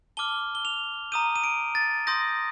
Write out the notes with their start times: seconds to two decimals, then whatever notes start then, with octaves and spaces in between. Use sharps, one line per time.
0.17 A5 D6 F6 G7
0.55 G7
0.65 F7
1.12 A#5 D#6 G6 D#7
1.36 D#7
1.44 D7
1.75 A6
2.07 C6 D#6 G6 A#6